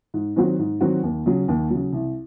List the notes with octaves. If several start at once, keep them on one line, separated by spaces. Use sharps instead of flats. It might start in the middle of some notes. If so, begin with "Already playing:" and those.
G#2
D#3 F#3 C4 F#4
G#2
D#3 F#3 C4 F#4
D#2
C#3 F#3
D#2
C#3 F#3
C2